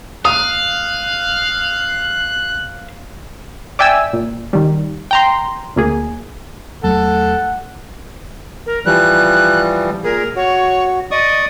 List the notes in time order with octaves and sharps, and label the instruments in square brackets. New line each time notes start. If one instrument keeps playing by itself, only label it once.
[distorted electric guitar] F5 [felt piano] D#6 [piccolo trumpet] F#6
[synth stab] D5 E5 G5 G#5 E6
A#2
D#3 G3
G5 A#5 C6
D2 A#3 G#4
[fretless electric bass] E2 F#3 A3 [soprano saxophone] A4 [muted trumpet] F#5
[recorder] A#4
[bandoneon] E3 F3 G3 [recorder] F#6
[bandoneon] A#2 G#4 [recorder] A#4
[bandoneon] F#4 [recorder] C#5
[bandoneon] D5 C#6 D#6 [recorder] D#5